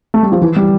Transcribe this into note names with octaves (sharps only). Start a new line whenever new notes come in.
A3
G3
F3
E3
G3